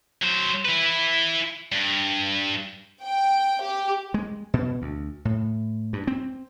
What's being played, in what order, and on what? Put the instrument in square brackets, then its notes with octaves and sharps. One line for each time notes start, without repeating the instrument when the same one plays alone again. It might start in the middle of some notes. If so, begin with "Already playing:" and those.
[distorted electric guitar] F#3 C5
E4 B4
G2
[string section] G5
G4
[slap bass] G#3
B2
D2
A2
G2
C4